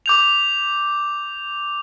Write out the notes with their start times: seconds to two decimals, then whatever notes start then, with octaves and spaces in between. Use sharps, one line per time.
0.06 D6 G6 F7